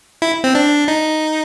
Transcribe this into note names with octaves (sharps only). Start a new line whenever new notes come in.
E4
C4
D4
D#4